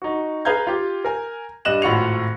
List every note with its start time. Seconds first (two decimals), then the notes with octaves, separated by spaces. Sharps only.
0.02 D#4 F#4
0.45 G#4 B4 F5 A#5 G6 G#6
0.67 F4 G4
1.04 A#4 G#5
1.65 G2 G3 D#5 F#6 E7 F#7
1.82 G#1 A2 F4 F#4 C#7 F7